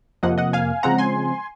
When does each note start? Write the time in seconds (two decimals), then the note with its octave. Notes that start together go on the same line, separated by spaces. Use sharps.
0.23 F2 C3 F3 A#3 D#5 F#5
0.38 D#5 F#5
0.53 F5 G#5
0.83 C#3 F3 G#3 C4 F#5 A#5
0.98 G#5 C6